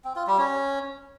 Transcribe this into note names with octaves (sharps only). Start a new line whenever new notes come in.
C4
F4
G3
C#4